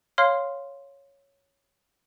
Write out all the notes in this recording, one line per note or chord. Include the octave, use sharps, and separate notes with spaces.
C#5 F5 C6 F6 C7